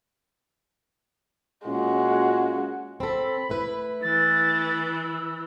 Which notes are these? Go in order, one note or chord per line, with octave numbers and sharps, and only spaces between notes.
A#2 G#3 C#4 F4 F#4
C4 A4 B5
A3 E4 B4
E3 A6
E6